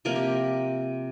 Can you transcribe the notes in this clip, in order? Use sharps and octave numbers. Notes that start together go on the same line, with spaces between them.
C3 F3 A#3 A#4
G4